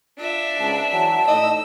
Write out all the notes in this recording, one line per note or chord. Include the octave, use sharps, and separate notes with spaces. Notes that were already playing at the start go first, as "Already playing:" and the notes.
D4 F4 E5
C#2 G#2 A5
E3 F#3 A5
A2 D4 D#4 D#5 E6